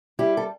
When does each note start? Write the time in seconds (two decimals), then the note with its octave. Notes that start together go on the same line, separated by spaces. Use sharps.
0.19 G3 E4 G4
0.37 A4